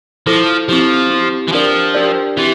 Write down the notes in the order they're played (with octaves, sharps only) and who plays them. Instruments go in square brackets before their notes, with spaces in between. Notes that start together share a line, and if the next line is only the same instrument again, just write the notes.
[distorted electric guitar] F3 [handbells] E4 A4 C5
[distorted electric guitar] F3 [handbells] C4 E4 G4
[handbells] C4 E4 G4
[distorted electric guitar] E3
[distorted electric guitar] F3 [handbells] D4 G4 A#4 D5
[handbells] D4 G4 A#4 D5
[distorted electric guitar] E3 [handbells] C4 G4